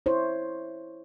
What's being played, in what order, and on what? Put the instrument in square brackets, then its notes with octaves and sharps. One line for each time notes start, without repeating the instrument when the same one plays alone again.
[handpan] E4 C5 C#5